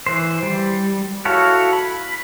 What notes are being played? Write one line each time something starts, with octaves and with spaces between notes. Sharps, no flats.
E3 C5
G3
E4 F#4 A4 C#5 F5
B5